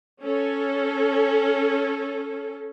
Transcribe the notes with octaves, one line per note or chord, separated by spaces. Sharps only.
C#4 A4